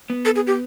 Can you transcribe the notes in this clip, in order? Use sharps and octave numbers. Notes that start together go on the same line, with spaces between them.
B3
A4
G#4
G4